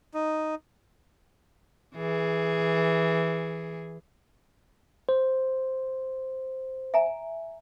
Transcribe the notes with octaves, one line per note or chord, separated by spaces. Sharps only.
D#4
E3 G#4
C5
E5 G#5 A#5